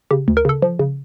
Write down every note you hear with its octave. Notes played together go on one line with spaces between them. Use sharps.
C#3 G4
D2
A#4
C#3 A4
F3
C#3